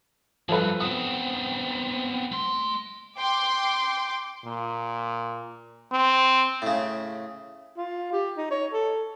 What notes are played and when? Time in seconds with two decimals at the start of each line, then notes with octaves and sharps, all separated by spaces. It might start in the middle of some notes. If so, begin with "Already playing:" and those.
0.49 D2 G2 F3 A4 B4
0.80 B3 C4 D#6
2.32 A3 C6
3.18 G5 C6 D6
4.45 A#2
5.92 C4
6.62 A2 C#3
7.77 F4
8.12 G4
8.37 D#4
8.51 C#5
8.73 A4